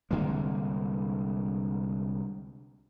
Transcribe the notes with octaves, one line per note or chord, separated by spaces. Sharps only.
C2 D3 G#3 A#3